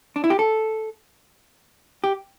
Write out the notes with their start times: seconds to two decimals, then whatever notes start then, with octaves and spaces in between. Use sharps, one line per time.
0.16 D4
0.24 E4
0.30 G4
0.39 A4
2.04 G4